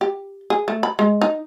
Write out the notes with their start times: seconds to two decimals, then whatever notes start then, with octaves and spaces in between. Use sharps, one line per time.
0.01 G4
0.50 G#4
0.68 A3
0.83 B5
0.99 G#3
1.22 D#4